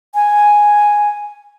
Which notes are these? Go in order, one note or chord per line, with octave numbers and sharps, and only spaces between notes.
G#5